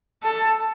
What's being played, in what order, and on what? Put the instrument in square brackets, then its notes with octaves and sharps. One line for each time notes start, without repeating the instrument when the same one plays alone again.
[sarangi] A4